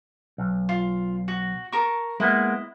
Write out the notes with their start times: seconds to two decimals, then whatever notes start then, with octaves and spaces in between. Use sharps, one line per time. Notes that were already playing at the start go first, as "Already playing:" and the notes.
0.38 B1
0.69 F4
1.28 F#4
1.72 A#4 A5 C#6
2.20 G#3 A#3 B3 E4 D#5